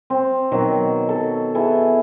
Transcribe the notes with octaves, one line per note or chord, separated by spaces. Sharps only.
C4
B2 D#3 F#3
A4
B3 E4 G#4 A4